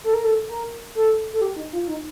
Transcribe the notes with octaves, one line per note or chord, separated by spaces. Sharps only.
A4
A#4
A4
A#4
A4
A4
G4
D#4
F4
D#4